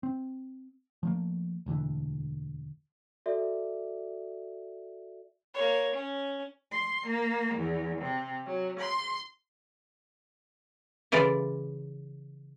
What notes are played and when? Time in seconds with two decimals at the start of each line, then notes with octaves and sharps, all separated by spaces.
0.03 C4
1.03 F3 A3 A#3
1.66 E1 D2 D3 E3
3.26 F#4 A4 D5 E5
5.54 A#3 C#5
5.94 C#4
6.72 C6
7.07 A#3
7.55 E2
8.02 C3
8.47 F#3
8.78 C6
11.12 C#3 E3 F4 D5